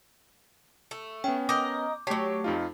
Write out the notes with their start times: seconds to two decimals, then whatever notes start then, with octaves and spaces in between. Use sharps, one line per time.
0.91 A3
1.24 B3 C#4 G5
1.49 A#4 D#5 D6 G6
2.07 F#3 A3 G4 C#5 A5 B6 C7
2.44 F2 D#4 F4